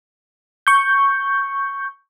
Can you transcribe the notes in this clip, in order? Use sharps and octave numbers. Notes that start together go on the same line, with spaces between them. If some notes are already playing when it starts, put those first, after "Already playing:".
C#6 G6